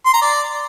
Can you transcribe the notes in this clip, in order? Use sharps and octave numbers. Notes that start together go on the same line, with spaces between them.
C6
A#5
D5